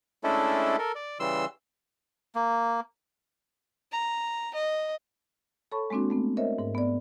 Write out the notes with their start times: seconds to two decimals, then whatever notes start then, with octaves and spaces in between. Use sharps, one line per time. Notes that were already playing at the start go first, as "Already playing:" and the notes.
0.24 G#3 A3 C#4 D4 E4 A4
0.78 A4 A#4
0.95 D5
1.20 C#3 E3 G3 C6 E6
2.35 A#3
3.92 A#5
4.55 D#5
5.72 A4 C#5 A5 B5 C#6
5.90 G#3 A#3 C4 D4 F#4
6.10 A3 B3 C4
6.37 A#4 C5 C#5 D#5 E5
6.59 G#2 A#4
6.75 B3 D5